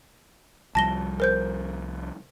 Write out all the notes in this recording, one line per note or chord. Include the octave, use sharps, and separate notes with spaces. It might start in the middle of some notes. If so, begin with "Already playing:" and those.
C2 F3 G3 A5 A#6 G7
A#4 C5 G6